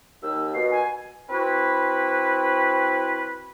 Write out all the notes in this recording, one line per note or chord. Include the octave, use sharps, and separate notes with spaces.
D#2 E6
B2 C7
G#5
C4 E4 F#4 B4